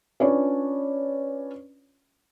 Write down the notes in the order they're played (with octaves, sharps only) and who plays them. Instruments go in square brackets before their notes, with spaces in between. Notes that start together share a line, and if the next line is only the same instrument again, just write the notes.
[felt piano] C#4 D4 F4 B4 C#5 D5